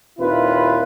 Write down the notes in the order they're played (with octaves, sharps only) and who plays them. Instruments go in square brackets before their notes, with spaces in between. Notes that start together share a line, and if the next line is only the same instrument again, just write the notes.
[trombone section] D#2 A#2 C4 E4 F4 B4